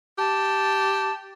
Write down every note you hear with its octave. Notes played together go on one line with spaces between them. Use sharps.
G4 A5